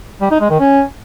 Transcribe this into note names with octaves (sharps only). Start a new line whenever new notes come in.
G3
D#4
G#3
D#3
C#4